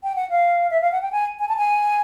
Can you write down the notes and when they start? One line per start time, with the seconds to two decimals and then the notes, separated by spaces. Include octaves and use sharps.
0.03 G5
0.16 F#5
0.30 F5
0.70 E5
0.81 F5
0.92 F#5
1.02 G5
1.12 G#5
1.39 G#5
1.48 A5
1.57 G#5